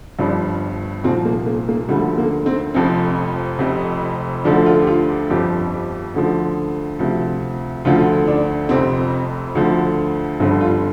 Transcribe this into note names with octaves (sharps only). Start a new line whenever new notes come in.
G1 G2 F3 D4
C2 A#2 F3 C4
A#3
A#3
A#3
D2 D3 F3 G3
A#3
C4
F1 F2 F3 C4
F1 F2 C3
D2 D3 F3 D4
F4
G4
F4
G4
G1 F2 F3 G4
G4
D2 D3 F3
D2 C3 F3
D2 D3 F3 F4
D4
F1 F2 C3 C4
D2 D3 F3
G1 G2 D3 F3 C4
F4